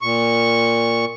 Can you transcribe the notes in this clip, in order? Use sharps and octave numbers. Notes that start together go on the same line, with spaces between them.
A#2 C#6